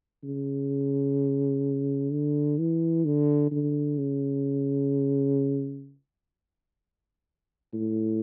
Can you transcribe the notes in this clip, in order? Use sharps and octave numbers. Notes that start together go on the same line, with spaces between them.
C#3
D3
E3
D3
D3
C#3
A2